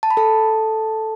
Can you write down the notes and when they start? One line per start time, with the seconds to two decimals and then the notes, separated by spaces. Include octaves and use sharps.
0.03 A5
0.11 B5
0.17 A4 A5